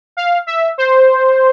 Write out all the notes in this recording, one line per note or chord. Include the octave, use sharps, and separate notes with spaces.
F5
E5
C5